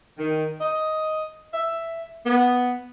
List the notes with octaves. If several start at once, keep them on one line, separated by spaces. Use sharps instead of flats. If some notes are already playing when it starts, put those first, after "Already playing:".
D#3
D#5
E5
B3